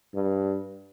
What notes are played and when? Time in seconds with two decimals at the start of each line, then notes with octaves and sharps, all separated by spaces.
0.15 G2